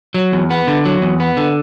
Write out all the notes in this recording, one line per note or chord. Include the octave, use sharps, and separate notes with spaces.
F#3
E2
B3
D3
F#3
E2
B3
D3